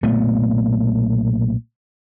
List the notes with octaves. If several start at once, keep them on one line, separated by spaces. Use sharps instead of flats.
B1 A#2 A3 B3